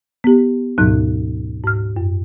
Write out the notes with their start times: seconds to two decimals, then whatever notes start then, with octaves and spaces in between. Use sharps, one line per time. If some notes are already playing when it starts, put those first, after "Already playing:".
0.24 B3 G4
0.78 D2 G#2 B2 F#3 D#4 F#6
1.64 G#2 F6
1.97 F#2